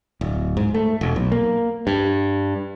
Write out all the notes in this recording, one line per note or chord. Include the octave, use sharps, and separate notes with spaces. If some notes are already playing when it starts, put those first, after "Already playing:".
D1
G#2
A3
E1
B1
A#3
G2